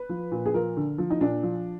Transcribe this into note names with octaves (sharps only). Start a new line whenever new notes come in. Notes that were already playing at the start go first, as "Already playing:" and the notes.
Already playing: B4
F3
A#2
G#4
F3 A#4
D3
F3
D#4
A#2 D4
F3